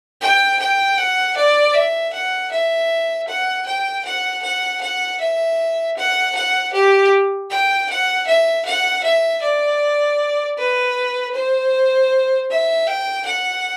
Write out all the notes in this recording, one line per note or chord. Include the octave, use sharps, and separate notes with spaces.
G5
G5
F#5
D5
E5
F#5
E5
F#5
G5
F#5
F#5
F#5
E5
F#5
F#5
G4
G5
F#5
E5
F#5
E5
D5
B4
C5
E5
G5
F#5